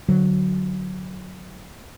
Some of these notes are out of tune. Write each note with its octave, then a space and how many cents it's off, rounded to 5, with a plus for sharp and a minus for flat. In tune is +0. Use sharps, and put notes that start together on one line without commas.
D3 +5 F#3 +0